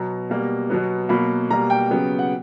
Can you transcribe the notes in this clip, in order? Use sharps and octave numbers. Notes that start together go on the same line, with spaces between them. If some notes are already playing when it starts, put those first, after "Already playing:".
Already playing: B2 F#3 B3 A#5
B2 G3 A#3
B2 F#3 B3
B2 F#3 A#3 B5
B2 G3 A#3 A#5
G5
C#3 F#3 B3
F#5